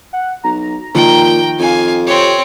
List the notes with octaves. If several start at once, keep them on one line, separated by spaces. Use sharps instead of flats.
F#5
B1 A#5
A#2 D#3 F3 A#4 G5
F2 F5 G#5
C4 G4 C#5